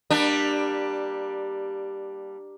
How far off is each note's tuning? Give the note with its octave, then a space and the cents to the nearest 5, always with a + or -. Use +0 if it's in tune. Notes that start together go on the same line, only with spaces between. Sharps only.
G3 +0 A#3 +15 D4 +15